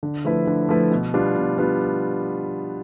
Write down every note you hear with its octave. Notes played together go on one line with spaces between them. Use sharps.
D3
F3 A3 E4 B4
D3
F3 A3 E4 B4
B2
G3 B3 D4 F4
B2
G3 B3 D4 F4